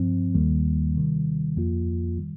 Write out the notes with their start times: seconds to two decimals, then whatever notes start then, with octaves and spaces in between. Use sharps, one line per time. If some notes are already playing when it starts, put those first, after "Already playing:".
Already playing: G2 F3 C4
0.35 D#2 D#3 G3 A#3
0.95 C3 D#3 G3
1.57 F2 F3 A#3 F4
2.18 D#3 G3